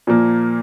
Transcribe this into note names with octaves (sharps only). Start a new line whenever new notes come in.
A#2 F3 A#3